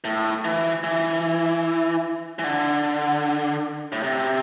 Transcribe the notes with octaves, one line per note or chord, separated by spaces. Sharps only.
A2
E3
E3
E3
D3
A2
C3